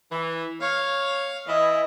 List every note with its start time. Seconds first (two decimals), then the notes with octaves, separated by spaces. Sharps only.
0.11 E3
0.61 C#5 F5
1.48 E3 E4 D#5